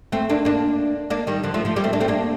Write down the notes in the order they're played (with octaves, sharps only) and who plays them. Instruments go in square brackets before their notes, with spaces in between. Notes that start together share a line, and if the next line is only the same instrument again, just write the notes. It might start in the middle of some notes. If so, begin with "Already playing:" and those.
[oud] A3 C4
A#3 D4
A#3 D4
A#3 D4
D#3 G3
D3 F3
F3 A3
F3 A3
G3 A#3
A3 C4
A#3 D4
A3 C4
A#3 D4